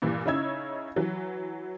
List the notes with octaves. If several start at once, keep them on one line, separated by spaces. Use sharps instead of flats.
G2 A#2 E3
C#3 C#4 D#4 E4 E6 G#6
E3 F#3